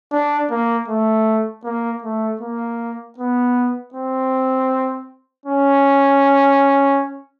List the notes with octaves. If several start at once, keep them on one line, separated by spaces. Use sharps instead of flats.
D4
A#3
A3
A#3
A3
A#3
B3
C4
C#4